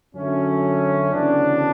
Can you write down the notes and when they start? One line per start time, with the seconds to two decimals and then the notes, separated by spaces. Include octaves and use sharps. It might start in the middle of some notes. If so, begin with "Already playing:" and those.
0.15 F#2 D3 F#3 A3 C#4
1.12 D2 C#3 E3 B3 D4